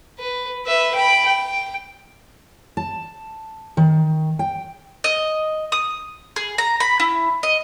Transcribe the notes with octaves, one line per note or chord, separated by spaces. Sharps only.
B4
B4 E5
G5 B5
G5
A5
D#3
G5
D#5
D#6
G#4
A#5
B5
E4
D#5